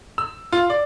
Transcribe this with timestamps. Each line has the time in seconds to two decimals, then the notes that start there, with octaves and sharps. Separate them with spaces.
0.18 E6
0.53 F4
0.70 D5